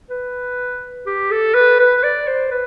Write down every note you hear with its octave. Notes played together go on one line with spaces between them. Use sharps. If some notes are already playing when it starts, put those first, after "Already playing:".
B4
G4
A4
B4
B4
D5
C5
B4